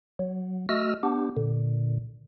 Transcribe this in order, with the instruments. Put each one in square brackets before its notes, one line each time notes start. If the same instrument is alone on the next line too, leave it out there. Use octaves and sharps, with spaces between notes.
[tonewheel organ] F#3
A3 F#4 D#5 E6 F6
B3 D4 G4
A#2 D3